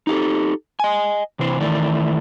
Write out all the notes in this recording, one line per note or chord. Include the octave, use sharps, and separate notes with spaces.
D#4 G4 A4
D#5 G#5
C3 E3 C5
D#3 E3 A3 D5